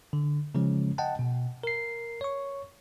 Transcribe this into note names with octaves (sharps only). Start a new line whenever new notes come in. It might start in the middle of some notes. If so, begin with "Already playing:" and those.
D3
C#3 F3 G#3 C#4
D#5 F#5 G5 A5
B2
A#4 C7
C#5 C#6